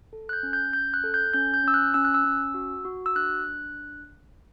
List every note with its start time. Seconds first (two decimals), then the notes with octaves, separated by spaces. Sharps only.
0.13 A4
0.29 F#6
0.33 G6
0.43 C#4
0.53 G6
0.73 C#4 G6
0.94 F#6
1.04 A4
1.14 G6
1.34 C#4 G6
1.54 G6
1.64 C#4 E6
1.74 F#6
1.94 C#4 E6
2.05 F#6
2.14 E6
2.25 C#4
2.54 F#4
2.85 F#4
3.06 E6
3.16 D4 F#6
3.46 D4